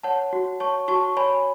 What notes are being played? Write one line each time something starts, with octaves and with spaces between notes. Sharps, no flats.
C#5 F#5 A5
F#4
C#5 A5 C#6
F#4 A5 C#6
C#5 G#5 B5